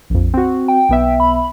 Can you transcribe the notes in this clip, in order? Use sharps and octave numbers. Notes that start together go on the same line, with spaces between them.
A#1 F2
C4 F#4
G5
B1 B3 E5
B5